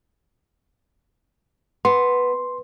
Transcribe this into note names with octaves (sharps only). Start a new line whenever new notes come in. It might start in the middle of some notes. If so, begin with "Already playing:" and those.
B3 C6